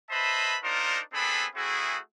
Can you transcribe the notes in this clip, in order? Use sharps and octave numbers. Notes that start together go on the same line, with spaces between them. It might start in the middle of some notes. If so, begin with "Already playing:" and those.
B4 C5 D#5 E5 A5 B5
D4 D#4 F4 A#4 C5 D5
B3 C4 D4 G#4 A4 B5
A3 C4 E4 F#4 G#4